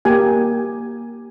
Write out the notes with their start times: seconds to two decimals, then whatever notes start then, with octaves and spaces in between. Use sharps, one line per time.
0.05 A#3 G4 G#5